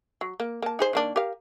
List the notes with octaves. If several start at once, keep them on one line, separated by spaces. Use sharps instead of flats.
F#3
A#3
A#3 A5
D#4 G#4 C5
D#3 A#3 D4
G4 A#4 F5